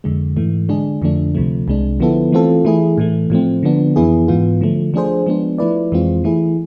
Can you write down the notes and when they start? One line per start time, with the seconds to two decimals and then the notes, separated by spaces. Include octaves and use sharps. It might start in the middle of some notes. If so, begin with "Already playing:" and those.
0.04 F2 D3 G#3
0.37 G#2 E3 A3
0.69 D3 G#3 D4 G#4
1.02 F2 D3 F3 A3 D4
1.35 D2 C3 F3 A3
1.68 C2 C3 G#3 D4
2.00 D3 F3 B3 E4 A4
2.32 E3 A3 C4 F4 A4
2.65 E3 A3 E4 G#4
2.98 A2 E3 A3
3.30 A2 F3 A3 C4
3.63 D3 F3 B3 D4
3.96 F2 E3 B3 E4 G#4
4.28 G#2 E3 B3 F4
4.61 D3 F3 A3
4.94 F3 A3 D4 G#4 C5
5.27 F3 G#3 B3 D4
5.58 F3 A3 E4 B4 D5
5.92 F2 E3 G#3 C4 F4
6.24 E3 A3 E4 G#4